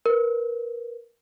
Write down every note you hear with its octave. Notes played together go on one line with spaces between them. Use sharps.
A#4 B4